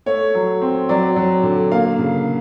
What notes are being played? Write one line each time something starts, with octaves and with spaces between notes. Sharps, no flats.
A3 C#5
F#3
C4
F#3 D5
F#3
D3
A#3 F5
C#3